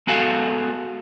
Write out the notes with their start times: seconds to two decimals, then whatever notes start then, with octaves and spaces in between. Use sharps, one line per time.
0.07 G#3 B3 F#4 G#4 A4 F5